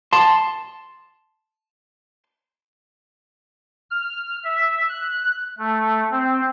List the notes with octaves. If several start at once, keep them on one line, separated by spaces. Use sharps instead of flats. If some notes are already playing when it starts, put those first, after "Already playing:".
A5 C6
F6
E5
F#6
A3
C4